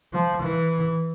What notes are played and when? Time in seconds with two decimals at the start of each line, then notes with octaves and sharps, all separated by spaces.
0.13 F3
0.43 E3